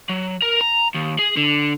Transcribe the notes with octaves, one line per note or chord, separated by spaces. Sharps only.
F#3
A#4
A#5
D#2
G#4
D3